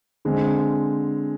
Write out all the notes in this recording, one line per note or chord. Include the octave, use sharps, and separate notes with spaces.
D3 G#3 C4